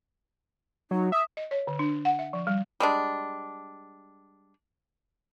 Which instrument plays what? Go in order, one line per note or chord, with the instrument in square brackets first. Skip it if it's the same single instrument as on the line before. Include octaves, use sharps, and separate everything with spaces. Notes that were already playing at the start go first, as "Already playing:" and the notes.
[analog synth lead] F#3 [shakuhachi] D#4
[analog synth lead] E5 [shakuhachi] D#6
[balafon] D#5
C#5
D3
D4
F#5
E5
F3
G3
[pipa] G3 G#3 D4